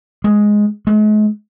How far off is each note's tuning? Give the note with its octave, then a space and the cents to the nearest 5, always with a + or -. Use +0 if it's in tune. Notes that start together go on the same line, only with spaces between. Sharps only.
G#3 +5
G#3 +40